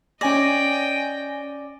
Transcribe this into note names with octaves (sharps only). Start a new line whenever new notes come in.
C#4 D5 D#5 G5 G#5 A#6